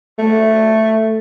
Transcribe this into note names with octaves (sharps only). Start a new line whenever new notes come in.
A3